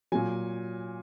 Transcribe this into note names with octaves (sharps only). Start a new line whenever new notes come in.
A#2 F#3 G#5